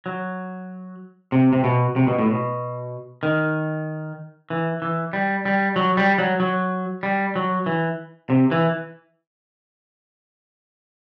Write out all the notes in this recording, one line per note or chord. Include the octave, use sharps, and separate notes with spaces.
F#3
C3
C3
B2
C3
B2
A2
B2
D#3
E3
E3
G3
G3
F#3
G3
F#3
F#3
G3
F#3
E3
C3
E3